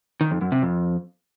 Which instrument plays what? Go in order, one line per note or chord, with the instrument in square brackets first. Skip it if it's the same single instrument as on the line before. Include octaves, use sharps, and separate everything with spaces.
[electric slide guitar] D#3
F2
F#2
C3
F2